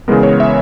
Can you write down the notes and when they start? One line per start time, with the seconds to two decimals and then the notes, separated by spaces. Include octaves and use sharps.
0.08 C#3 E3 G#3 B3 A#4
0.23 C#5
0.40 E5